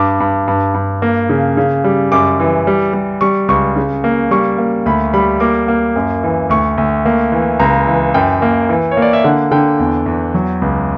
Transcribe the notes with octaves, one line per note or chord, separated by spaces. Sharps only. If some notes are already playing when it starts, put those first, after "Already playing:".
Already playing: G2 D6
G2
G2
G2
A#3
C#3
C#3
G3
F#2 D6
E3
G3
G3
G3 C#6
C#2 C#6
C#3
A#3
G3 C#6
A#3
D2 B5
G3 B5
A#3 D6
A#3
F#2
E3
D2 C#6
D2
A#3
E3
C#2 A#5
E3
F#2 G5
A#3
E3
C#5
A#3
D5
E5
D3 F#5
D3 G5
E2
E2
F#3
C#2